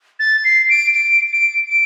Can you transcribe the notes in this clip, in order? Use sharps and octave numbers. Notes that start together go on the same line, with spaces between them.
A6
C7
D7
D7
D7
D7